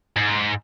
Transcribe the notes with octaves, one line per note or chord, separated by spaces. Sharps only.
G#2